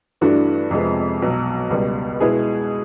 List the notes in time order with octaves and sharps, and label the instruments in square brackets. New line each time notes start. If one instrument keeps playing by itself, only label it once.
[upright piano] G2 E3 A3 D4 F#4
F2 C3 F3 G#3 B3
B1 B2 F#3
C#2 B2 G3
B2 G#3 B3 E4 G#4